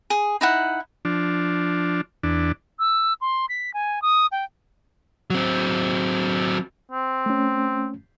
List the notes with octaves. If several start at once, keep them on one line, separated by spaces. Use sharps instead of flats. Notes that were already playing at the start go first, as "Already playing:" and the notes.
G#4
D#4 E4 F#5
F3 D4
E2 D4
E6
C6
B6
G#5
D#6
G5
F#3 C4
C4
A3 C#4